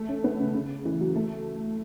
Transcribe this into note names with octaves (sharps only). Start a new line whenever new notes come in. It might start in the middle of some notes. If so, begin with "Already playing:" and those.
Already playing: A3
C#4
B3
C#3
C#3
E3
F#3
A3